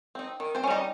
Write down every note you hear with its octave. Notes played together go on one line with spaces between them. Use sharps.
C4 D#4
D#3
C4 C5
C#4
G3 D#4 D#5